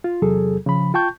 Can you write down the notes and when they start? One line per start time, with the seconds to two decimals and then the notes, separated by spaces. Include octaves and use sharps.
0.04 F4
0.22 E2 C3 F#3 G#4 A4
0.66 C#3 F3 B5
0.94 F4 G5 A5 C#6 G6